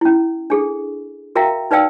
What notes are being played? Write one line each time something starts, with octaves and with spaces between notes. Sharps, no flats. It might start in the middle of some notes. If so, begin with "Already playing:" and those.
C#4 E4
D4 G#4 A4
F#4 A#4 E5 F5 G5 A#5
D#4 B4 D5 F5 G5 E6